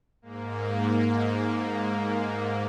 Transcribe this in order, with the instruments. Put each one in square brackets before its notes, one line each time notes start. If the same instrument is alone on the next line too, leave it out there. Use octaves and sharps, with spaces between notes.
[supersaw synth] G#2 A#3